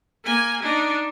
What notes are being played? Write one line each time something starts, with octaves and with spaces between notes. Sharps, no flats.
A#3 G#5
D4 D#4